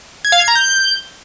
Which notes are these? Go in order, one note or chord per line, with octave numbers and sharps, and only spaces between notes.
G#6
F5
G#6
A#5
G6